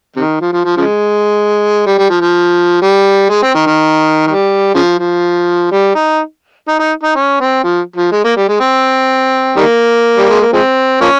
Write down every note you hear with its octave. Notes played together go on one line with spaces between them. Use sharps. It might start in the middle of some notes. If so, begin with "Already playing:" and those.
C3 D#3
F3
F3
F3
C#3 F3 G#3
G3
G3
F3
F3
G3
G#3
C4
D#3
D#3
D#3 G3
C#3 F3
F3
G3
D#4
D#4
D#4
D#4
C#4
C4
F3
F3
G#3
A#3
G3
G#3
C4
D#3 G3 A#3
G3
G#3
A#3
F3 G#3 C4
F3 A#3 C#4